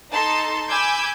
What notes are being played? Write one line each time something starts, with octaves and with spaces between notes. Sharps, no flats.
D#4 A4 A5 C6
G#5 B5 D6 E6 G6 G#6